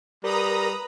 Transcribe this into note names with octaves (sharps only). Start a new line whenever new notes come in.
G3 A#4 B4 A#5 B5 D#6